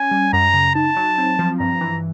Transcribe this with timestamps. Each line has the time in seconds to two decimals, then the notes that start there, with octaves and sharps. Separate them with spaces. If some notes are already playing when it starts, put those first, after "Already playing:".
Already playing: C#4 G#5
0.11 G3
0.33 F#2 A#5
0.54 C#3
0.75 D#4 A5
0.97 F#3
1.18 C4
1.39 F3
1.60 G2 A#5
1.81 E3